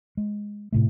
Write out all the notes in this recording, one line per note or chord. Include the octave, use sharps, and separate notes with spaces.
G#3
A2 C3 A3